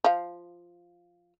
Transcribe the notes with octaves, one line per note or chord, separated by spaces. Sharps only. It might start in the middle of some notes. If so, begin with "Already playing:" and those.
F3 F5